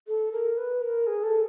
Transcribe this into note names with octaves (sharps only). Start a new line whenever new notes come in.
A4
A#4
B4
A#4
G#4
A4